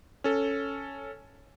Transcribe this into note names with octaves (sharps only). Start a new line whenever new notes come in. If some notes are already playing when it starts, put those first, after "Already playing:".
C#4 A4